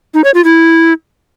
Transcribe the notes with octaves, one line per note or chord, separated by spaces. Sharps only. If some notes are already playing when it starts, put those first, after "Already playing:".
D#4
C#5
F4
E4